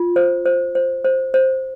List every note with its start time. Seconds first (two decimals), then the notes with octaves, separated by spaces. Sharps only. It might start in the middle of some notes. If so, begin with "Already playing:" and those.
Already playing: F4
0.16 C5
0.45 C5
0.75 C5
1.05 C5
1.34 C5